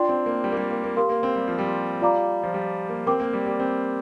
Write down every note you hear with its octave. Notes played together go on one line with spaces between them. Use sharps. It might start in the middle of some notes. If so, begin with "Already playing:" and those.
Already playing: D4 F4 D5 G5 C6
C4
A#3
G3
A#3
G3
A#3
A#3
G4 A#4 F5 C6
A#3
C4
G3
F3
G3
F4 D5 F5 A#5 D6
F3
G3
A#3
C4 A#4 G5 D6
A#3
G3
G3
C4